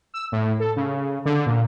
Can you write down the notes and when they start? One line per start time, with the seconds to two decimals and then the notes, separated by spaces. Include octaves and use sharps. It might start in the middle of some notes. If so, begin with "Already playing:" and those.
0.14 E6
0.32 A2
0.60 A4
0.76 C#3
1.25 D3
1.46 A#2